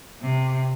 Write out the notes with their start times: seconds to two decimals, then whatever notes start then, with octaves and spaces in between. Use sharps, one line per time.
0.22 C3